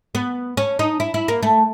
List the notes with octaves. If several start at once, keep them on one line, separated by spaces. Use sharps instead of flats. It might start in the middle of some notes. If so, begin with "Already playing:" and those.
B3
C#4
D#4
E4
E4
A#3
A3